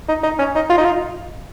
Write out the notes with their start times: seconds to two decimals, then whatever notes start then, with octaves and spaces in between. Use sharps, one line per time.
0.08 D#4
0.24 D#4
0.39 C#4
0.56 D#4
0.70 F4
0.78 D#4
0.85 F4